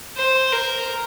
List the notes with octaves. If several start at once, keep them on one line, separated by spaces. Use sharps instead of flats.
C5
A#4